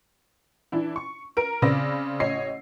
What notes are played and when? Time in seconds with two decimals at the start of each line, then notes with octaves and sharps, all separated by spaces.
0.72 E3 D4 E4
0.96 C#6
1.37 A#4 D7
1.62 C#3 C4 D5 B5 E6 A#6
2.20 A1 C#5 D#5 C7